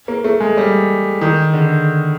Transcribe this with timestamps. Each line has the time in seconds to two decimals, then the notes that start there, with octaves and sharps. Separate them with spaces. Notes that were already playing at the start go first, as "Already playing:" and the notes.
0.08 A#3
0.24 A3
0.40 G#3
0.57 G3
1.21 D#3
1.54 D3